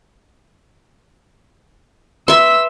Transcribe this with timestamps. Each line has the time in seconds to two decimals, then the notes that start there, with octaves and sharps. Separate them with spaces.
2.28 B4 E5 C6 E6